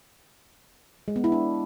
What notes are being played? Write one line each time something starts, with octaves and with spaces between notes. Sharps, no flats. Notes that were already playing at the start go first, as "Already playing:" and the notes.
G#3
B3
E4
D4